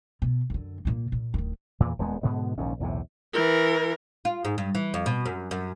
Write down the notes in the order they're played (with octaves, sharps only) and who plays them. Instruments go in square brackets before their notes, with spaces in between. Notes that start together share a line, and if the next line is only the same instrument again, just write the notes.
[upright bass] B2
F#2 D3
A#2 A#3
A#2
D1 D#3
[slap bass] E2 A#2 E3
D#1 E2 G#3 B3
G#2 B2 D3 B3
A#1 D#2 G#2 C#4
B1 E2 A2 C3
[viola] E3 A#4
[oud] F4
G#2
G2
E3
F2
B2
F#2
F#2